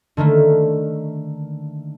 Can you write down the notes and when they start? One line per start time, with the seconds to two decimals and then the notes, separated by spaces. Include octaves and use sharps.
0.17 D3 D#3 A3 A#3